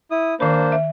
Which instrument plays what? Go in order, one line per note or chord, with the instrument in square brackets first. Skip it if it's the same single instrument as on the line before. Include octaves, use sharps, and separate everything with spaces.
[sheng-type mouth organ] E4 D#6
[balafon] D#3 B5 [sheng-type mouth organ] A#3 D4 C5
[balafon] E5